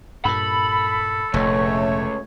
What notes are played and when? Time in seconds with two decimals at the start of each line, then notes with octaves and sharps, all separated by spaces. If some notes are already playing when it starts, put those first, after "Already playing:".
0.25 G2 A#2 A4 B5
1.34 F1 C#2 A#2 A3 C#5